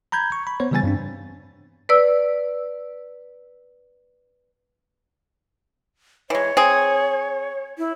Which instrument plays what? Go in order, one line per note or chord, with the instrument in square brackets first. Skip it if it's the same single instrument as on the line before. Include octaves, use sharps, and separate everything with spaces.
[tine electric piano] A#5 B5 G6 G#6
C#6
B5
B3 C5 C#5
C#3 E3 G3 B3 G#5 A6
G2 C4 D4
[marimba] B4 D5 E6
[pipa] E3 G#3 [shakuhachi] C#5
[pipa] C4 G#4
[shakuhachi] E4